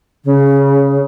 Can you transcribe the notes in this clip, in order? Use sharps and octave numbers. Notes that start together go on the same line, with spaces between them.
C#3